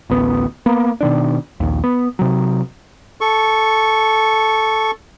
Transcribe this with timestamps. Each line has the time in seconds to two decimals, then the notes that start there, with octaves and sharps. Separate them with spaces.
0.10 A1 D2 B3
0.66 A#3 B3
1.01 B2 D#3 D4
1.60 A#1 D#2
1.84 B3
2.19 C3 F#3
3.21 A4 C#6